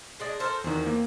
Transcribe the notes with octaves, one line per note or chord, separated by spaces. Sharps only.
G#3 D4 D#5
A4 A#4 C5
E2 D#3 C4 F#4
A#3